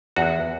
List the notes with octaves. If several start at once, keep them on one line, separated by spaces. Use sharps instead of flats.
E2 F#4